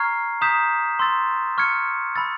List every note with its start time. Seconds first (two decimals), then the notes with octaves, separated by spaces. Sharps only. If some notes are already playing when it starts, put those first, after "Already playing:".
Already playing: A#5 C#6 F6 G#6 C7
0.41 A#5 D#6 G6 B6 E7
0.99 C6 E6 A6
1.58 C#6 F6 G#6 C#7
2.16 B5 E6 A6